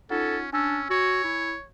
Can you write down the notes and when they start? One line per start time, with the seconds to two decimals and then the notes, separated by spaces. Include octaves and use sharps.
0.10 C#4 D#4 F4 A4 F#5
0.53 C#4 D4 G#5 E6
0.90 F#4 C#5
1.24 E4